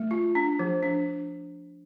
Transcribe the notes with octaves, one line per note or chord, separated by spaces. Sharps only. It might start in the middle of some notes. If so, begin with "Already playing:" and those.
Already playing: A3
F4
D4
F3
D4